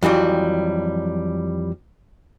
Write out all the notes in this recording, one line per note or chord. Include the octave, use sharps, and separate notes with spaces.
F2 E3 F#3 G3